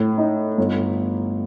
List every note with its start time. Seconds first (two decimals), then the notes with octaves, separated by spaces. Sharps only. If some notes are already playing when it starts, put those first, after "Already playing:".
Already playing: A2
0.18 D#4
0.58 G1